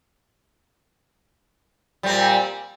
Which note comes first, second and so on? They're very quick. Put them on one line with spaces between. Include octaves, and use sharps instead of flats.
G3 C4 A#2